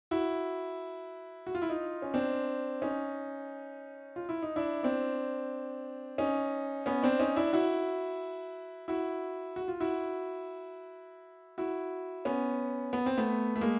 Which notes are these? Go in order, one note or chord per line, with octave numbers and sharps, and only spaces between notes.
E4 F#4
F#4
F4
E4
D#4 F4
C#4
C4 D4
C#4 D#4
F4
E4
D#4
D4 E4
C4 D4
C#4 D#4
B3 C#4
C4 D4
C#4 D#4
D4 E4
E4 F#4
E4 F#4
F#4
F4
E4 F#4
E4 F#4
B3 C#4
B3
C4
A3 B3
A3
G#3 A#3